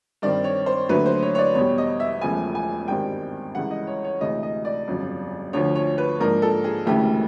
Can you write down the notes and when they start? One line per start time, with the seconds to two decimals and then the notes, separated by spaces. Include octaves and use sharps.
0.22 G2 D#3 G3 C4 D5
0.44 C#5
0.66 C5
0.89 D#2 D3 F#3 A3 B4
1.06 C5
1.23 C#5
1.35 C#5
1.39 D5
1.55 E2 B2 G3 C#5
1.78 D#5
2.00 E5
2.21 E1 E2 C#3 F3 A3 G#5
2.55 G#5
2.88 G#1 G2 D#3 G3 C4 G5
3.55 C#2 C#3 E3 G3 F#5
3.71 D#5
3.87 C#5
4.05 C#5
4.21 D2 C3 E3 G#3 D#5
4.43 D#5
4.65 D5
4.88 G1 F2 C#3 F#3
5.53 D2 D3 F3 C#5
5.76 C#5
5.98 B4
6.20 G#2 F3 A#3 D4 A#4
6.42 A4
6.64 G#4
6.86 E1 D2 C#3 E3 A3 G4